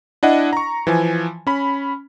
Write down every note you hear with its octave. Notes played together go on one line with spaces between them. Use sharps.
D4 E4 D#5 F#5
A#5 C#6
E3 F3 G#5
C#4 B5